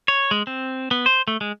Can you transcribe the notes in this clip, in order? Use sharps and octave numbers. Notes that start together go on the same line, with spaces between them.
C#5
G#3
C4
B3
C5
A3
G#3